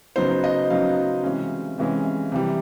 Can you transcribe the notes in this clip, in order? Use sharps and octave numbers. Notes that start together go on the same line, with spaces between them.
C#3 F#3 B3 D#4 C5
D#5
C#3 F#3 B3 D#4 F5
C3 E3 G#3 C#4
C3 E3 G#3 C#4
C3 E3 G3